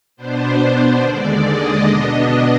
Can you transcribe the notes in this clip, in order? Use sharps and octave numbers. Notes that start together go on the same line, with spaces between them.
B2 B3 D4 C5
D#2 D3 G#3 D5
D#5
B2 B3 D4